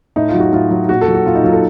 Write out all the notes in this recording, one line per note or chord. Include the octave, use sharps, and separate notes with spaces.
A2 D#4
F4
F#3
F#4
A2 F4
F#3
A#2 F#4
A4
F#3
F#4
A#2 F4
D#4
F#3 F4
A4